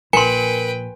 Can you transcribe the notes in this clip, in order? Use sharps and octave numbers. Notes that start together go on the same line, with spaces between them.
A#1 A#4 B4 G5 G#5 C6 C#7